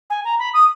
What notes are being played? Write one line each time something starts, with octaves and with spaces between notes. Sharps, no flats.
G#5
A#5
B5
D#6